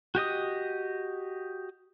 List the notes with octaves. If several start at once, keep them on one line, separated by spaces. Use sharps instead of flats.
F#4 G4 D#5 D#6